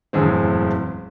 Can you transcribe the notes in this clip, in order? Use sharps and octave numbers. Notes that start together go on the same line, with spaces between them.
F#1 E2 A2 G#3 C4